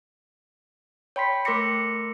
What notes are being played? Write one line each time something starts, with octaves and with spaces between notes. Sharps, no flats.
C#5 G5 B5 C6 B6 C7
A3 A#4 C6 D6 A#6 C#7